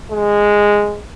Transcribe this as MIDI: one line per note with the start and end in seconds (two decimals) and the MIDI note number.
0.11 0.99 56